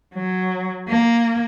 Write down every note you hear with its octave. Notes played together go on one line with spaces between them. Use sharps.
F#3
A#3